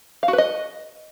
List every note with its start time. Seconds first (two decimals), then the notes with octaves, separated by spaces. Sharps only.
0.23 F5
0.28 F#4
0.33 B4
0.38 D#5